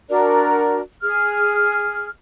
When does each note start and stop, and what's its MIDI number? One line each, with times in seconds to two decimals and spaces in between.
0.09 0.81 62
0.09 0.81 66
0.09 0.81 70
0.09 0.81 74
1.02 2.10 68
1.02 2.10 89